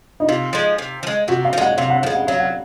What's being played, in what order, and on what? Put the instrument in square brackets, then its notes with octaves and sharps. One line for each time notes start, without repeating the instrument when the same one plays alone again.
[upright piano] D#4
[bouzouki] C3 [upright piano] F4
[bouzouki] F3 G#3
C3
F3
G#3
[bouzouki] C3 [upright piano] F#4
[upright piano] F5
[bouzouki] F3
[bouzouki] G#3 [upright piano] F#5
[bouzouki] C3 [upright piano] F5
[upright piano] F#5
[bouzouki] F3 [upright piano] F5
[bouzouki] G#3
[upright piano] F#5
[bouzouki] F#3 [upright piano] F5
[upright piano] F#5